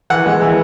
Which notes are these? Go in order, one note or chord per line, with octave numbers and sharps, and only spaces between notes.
E3 F#5
G#3
E3